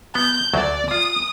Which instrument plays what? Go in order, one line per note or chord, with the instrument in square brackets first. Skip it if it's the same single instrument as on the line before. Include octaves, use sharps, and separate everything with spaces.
[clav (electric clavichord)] B3 [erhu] G6
[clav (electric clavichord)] D2 F#3 A5 [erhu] D5
[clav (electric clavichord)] F4 [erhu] D#6